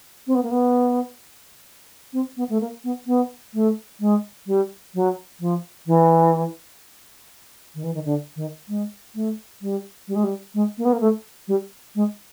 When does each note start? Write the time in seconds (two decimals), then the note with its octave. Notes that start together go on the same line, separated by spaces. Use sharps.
0.27 C4
0.35 B3
0.43 A#3
0.51 B3
2.13 C4
2.37 B3
2.49 A3
2.61 A#3
2.84 B3
3.07 B3
3.54 A3
4.00 G#3
4.47 G3
4.95 F#3
5.40 F3
5.87 E3
7.75 D#3
7.84 E3
7.94 D#3
8.05 D3
8.36 D#3
8.68 G#3
9.15 A3
9.62 G3
10.08 G3
10.15 G#3
10.24 G3
10.54 G#3
10.78 A#3
10.85 B3
10.93 A#3
11.01 A3
11.48 G3
11.95 G#3